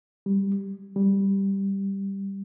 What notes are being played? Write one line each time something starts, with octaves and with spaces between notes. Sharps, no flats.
G3
G3